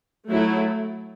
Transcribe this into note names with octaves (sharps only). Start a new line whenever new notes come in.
F#3 A3 E4